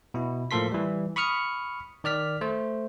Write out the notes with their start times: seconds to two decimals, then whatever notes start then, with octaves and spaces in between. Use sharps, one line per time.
0.14 B2 E4
0.51 A2 F3 A#3 A4 C6 B6
0.72 E3 G3
1.16 B5 C#6 D#6 F6 C#7
2.04 D#3 D5 F6 B6
2.41 A3 C5